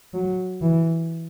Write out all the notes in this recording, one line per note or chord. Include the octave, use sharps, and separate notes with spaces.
F#3
E3